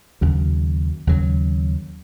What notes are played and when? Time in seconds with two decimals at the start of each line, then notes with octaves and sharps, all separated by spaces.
0.21 D#2 C#3 F#3
1.07 D#2 C#3 F#3